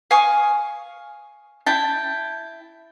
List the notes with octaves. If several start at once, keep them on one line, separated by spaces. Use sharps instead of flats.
F5 G#5 C#6 D#6
E4 G5 A5